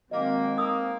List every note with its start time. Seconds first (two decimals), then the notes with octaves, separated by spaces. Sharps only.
0.11 D#3 F#3 G#3 A#3 C4 D#5
0.57 A#3 D#4 D#6 E6